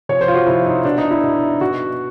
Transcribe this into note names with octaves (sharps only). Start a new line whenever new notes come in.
C3 F3 C#5
C5
F4
F#4
C3 F3 E4
D#4
B2 D4
D#4
E4
B2
B2 F#4